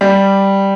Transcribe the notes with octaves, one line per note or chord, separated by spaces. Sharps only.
G3